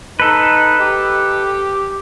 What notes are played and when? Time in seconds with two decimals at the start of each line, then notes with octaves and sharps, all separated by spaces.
0.20 D#4 A4 B4
0.80 G4